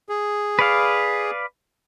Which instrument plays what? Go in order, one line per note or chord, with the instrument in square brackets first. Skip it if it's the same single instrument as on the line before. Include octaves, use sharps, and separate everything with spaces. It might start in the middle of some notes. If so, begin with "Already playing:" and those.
[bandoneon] G#4
[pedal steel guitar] B4 D5 F5